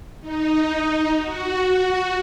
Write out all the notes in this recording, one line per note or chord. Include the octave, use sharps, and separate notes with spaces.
D#4
F#4